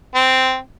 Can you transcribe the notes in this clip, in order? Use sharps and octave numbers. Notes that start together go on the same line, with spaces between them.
C4